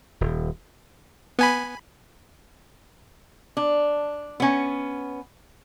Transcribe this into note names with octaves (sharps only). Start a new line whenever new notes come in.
D#1
B3 G#5 B5
D4
B3 C#4